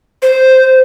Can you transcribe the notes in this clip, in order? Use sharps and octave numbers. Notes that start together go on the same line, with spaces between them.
C5